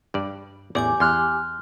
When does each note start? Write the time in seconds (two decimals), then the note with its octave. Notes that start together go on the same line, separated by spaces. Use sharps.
0.14 G2 D5
0.75 A1 E2 G4 D5 G#5 D6
1.00 E2 C6 F6 F#6